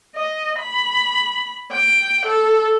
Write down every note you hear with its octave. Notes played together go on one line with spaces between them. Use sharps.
D#5
B5
G5
A4